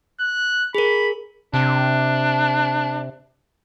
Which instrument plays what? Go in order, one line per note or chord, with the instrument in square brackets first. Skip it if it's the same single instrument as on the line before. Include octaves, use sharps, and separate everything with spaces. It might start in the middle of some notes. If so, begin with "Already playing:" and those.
[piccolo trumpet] F#6
[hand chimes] G#4 A#4 [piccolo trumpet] B5
[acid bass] C3 [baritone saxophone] D4